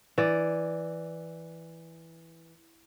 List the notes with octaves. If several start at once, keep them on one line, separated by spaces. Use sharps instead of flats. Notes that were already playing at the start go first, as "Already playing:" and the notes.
E3 D5